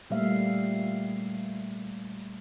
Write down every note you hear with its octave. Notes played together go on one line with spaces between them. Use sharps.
A#2 G3 A3 A#3 E5 F5